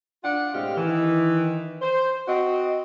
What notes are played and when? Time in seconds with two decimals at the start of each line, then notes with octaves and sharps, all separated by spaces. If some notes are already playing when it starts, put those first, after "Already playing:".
0.23 D4 F4 F#5
0.54 A2 C3 G#3 C4 G4 F5
0.76 D#3 E3
1.82 C5
2.28 C4 F#4 D#5